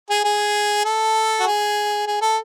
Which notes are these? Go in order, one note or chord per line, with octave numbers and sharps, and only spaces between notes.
G#4
G#4
A4
F#4
G#4
G#4
A4